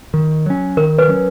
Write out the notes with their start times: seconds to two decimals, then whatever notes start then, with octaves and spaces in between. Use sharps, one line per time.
0.14 D#3
0.46 F#3 C#4
0.77 D#3 A#4
0.98 B4
1.08 F#3 C#4